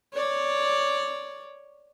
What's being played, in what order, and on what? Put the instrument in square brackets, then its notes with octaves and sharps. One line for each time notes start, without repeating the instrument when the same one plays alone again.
[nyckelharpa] C#5 D5